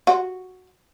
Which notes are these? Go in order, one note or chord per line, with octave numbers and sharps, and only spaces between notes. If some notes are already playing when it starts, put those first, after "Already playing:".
F#4